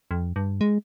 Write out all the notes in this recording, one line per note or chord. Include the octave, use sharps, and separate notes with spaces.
F2
G2
G#3